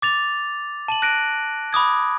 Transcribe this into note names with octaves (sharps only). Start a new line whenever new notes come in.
D6 A6 F7
A5 D#7 F#7
F#6 A#6 D7 D#7
B5 D6 D#6 G#6